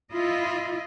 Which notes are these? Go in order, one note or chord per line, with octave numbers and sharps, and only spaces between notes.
E4 F4 D#5